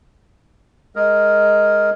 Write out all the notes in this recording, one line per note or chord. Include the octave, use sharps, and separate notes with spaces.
G#3 A#4